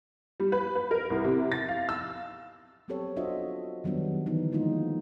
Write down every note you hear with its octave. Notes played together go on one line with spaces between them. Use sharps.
G3
B4
B4
A#4
C2
C3
A6
F5
E6
F#3 B3 C4 G4 A4 C#5
D4 F4 F#4 C5 D#5 E5
D#3 F#3 G3 B3 D4
D3 E3 B3 D#4
F3 G#3 A#3 D#4 F4